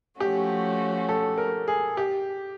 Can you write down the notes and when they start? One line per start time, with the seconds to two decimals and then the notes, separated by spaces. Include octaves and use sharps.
0.20 F3 A3 C#4 F#4 G4
1.09 A4
1.38 A#4
1.68 G#4
1.97 G4